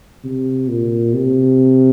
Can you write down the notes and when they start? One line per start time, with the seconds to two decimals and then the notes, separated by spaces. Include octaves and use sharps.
0.23 C3
0.68 A#2
1.14 C3